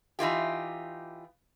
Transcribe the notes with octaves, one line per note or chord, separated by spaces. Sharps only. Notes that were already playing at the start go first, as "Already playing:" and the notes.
E3 D#4 F4 G4